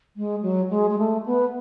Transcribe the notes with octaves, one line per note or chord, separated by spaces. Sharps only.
G#3
F#3
G#3
G#3
A3
B3